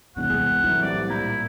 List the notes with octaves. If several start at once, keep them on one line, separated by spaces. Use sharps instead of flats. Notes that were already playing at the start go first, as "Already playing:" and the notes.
E1 C3 F#5
C2 C4 G#4
A2 E3 F#3 A3
C2 D5
A#2 E4 A#5 G6